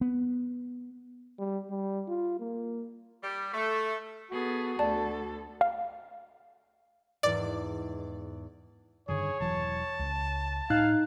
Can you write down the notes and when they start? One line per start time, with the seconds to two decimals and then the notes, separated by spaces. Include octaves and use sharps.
0.01 B3
1.39 G3
1.70 G3
2.08 F4
2.40 A#3
3.23 G3
3.53 A3
4.31 B3 F#4 G#4 A4
4.79 D2 A4 D5 A5
5.61 F5
7.23 E2 G#2 D5
9.09 G2 D3 D#3 G#4 C#5
9.40 E1 E3 F#3 A5
9.99 C#2
10.70 A2 D#4 F5 F#6